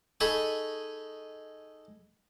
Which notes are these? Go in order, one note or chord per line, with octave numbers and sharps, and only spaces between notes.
D#4 G#4 A4 B5 C#6 D#6